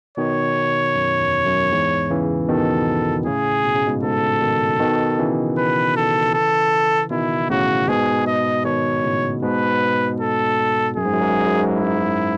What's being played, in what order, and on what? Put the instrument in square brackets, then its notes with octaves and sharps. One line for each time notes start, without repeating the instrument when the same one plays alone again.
[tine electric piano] B2 D#3 [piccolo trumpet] C#5
[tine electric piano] F#2
E2
F#2
E2 G#2
C#3 E3
[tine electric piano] B2 D#3 [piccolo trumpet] A4
[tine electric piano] A2 C#3 [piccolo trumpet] G#4
[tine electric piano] B2
C#3
G#2 B2
[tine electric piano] G#2 B2 [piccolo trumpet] A4
[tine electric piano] B2 D#3
B2 D#3
C#3 E3
[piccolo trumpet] B4
A4
A4
[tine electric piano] B2 D#3 [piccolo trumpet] E4
[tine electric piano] A2 C#3 [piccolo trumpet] F#4
[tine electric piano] G#2 B2 [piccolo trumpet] G#4
[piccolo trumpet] D#5
[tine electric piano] B2 D#3 [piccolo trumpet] C#5
[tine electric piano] A2 C#3
[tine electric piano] G#2 B2 [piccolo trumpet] B4
[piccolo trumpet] A4
[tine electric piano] F#2 [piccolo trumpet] G#4
[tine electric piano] G#2
F#2
G#2
F#2
G#2
F#2
G#2
F#2
[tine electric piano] G#2 [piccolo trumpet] E4
[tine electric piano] F#2
G#2
F#2
G#2